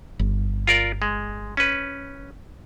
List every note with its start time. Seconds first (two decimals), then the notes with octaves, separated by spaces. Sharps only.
0.19 G1
0.67 F4 A#4 D5
1.02 G#3
1.57 C#4 B4